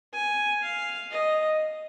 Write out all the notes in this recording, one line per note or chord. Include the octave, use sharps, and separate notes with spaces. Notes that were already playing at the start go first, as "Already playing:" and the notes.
G#5
F5
D#5